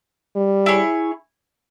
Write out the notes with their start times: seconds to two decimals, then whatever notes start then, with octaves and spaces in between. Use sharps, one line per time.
0.36 G3
0.66 E4 G#4 C#5